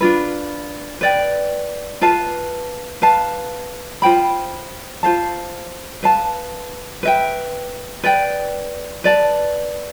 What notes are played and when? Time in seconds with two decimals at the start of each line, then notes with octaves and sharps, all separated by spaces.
0.01 D4 F4 B4
1.01 B4 D5 G5
2.01 F4 B4 F5 A5
3.02 B4 F5 A5
4.02 F4 C5 G5 B5
5.03 F4 C5 F5 A5
6.03 B4 F5 A5
7.03 B4 E5 G5
8.04 B4 D5 G5
9.04 B4 D5 A5